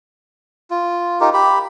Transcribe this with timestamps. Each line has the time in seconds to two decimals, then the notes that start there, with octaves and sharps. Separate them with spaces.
0.71 F4
1.21 D#4 F4 G4 A#4
1.33 G4 B5